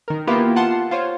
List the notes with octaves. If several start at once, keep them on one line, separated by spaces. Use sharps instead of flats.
D#3 A#4
A#3 B3 E4 F4 G4
F4 F#5 A5 C6
F4 C5 C#5